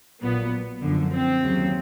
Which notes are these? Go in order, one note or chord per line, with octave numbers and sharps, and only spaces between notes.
A#1 A#2 F#3 B3
F#2 D3 F3
C4
D#2 C#3 F#3